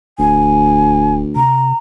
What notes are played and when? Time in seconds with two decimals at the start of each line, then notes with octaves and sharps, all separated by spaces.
0.19 D#1 D2 G#5
1.36 C3 A#5